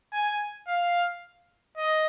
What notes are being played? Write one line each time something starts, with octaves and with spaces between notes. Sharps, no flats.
G#5
F5
D#5